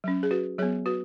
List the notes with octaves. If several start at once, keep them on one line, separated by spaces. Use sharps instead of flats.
F#3 C#4
G#4
F#4 B4
F#3 B3 G#4 C#5
F#4 B4